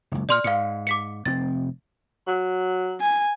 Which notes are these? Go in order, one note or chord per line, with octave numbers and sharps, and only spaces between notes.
F#1 C#2
A#2 D5 C6 F6
G#2 F5 C#7
D6 B6 C#7
F1 C4 A6
F#3
G#5